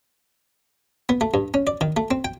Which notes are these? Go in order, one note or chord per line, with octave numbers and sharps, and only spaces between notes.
B3
A3
G2
C#4
D5
D#3
A3
C4
G5